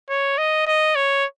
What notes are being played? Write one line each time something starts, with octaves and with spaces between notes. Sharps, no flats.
C#5
D#5
D#5
C#5